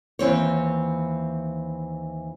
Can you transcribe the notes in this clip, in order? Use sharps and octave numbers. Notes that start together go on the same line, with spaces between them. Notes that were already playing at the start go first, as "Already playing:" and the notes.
D#2 E3 C4 C#5